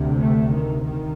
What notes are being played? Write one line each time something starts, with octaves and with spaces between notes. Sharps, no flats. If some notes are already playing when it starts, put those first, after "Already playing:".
Already playing: D2 C3
A3
D#3
D#3